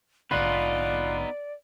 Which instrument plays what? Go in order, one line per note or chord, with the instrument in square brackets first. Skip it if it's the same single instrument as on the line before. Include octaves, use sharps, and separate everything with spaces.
[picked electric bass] A#1 G#2 D3 [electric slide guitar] B3 D#4 [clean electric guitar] F4 B4 [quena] D5